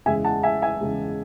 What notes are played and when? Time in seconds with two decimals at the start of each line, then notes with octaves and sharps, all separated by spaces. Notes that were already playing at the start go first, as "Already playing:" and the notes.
0.06 E2 C#3 G#3 E5 G#5
0.24 F#5 A5
0.43 E5 G#5
0.62 E5 G#5
0.81 E2 C#3 G#3